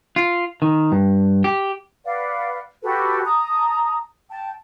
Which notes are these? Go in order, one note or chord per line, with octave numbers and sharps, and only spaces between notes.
F4
D#3
G2
G4
B4 D5 F5 F#5
F#4 G4 A4 B4
A5 A#5 D#6
G5 A5